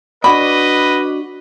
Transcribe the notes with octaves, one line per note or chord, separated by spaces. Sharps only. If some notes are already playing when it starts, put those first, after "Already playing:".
D4 F#4 B4 D5 D#5 B5